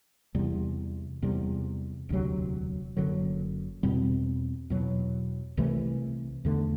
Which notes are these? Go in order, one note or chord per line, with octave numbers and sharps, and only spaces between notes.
E2 C3 G3
E2 C3 G3
E1 D2 C3 F#3
F#1 F#2 D3 F#3
E2 B2 G3 C4
E2 B2 F#3
C2 C3 E3 A3
E2 D3 A3